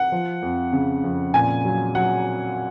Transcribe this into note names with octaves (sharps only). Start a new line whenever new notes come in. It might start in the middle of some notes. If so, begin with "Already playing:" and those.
Already playing: F#5
F3
F2
C#3
F2
A#2 G#5
F#3
F#3 F#5